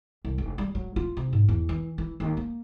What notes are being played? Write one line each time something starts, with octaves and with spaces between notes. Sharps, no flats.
C2
F1
G3
F#3
F4
C3
G#2
E2
E3
E3
D#2
A#3